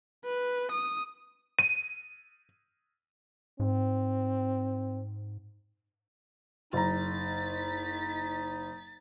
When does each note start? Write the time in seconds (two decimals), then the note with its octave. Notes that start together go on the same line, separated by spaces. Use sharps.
0.25 B4
0.71 D#6
1.59 D#7
3.60 G#2 C4
6.73 F#1 D#4 A#5 A6 B6